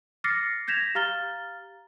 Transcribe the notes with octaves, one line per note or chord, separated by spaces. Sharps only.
D6 F6 A6 A#6 C7 C#7
G6 G#6 A#6 B6 E7 F7
G4 F5 A#5 F6 A6 G7